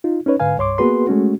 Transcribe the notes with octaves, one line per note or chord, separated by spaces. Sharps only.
D#4 F4
C#4 D#4 B4 C#5
G#2 D3 B4 F5 G#5
C2 G2 C#5 C6 D6
A#3 B3 F#4 G#4 B4 C6
G#3 A3 C#4 F#4